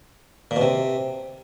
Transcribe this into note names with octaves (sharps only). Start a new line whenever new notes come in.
A#2
B2
C3